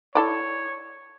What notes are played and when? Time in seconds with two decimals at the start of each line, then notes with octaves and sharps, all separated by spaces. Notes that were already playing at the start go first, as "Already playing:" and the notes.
0.15 E4 A4 C#5 D5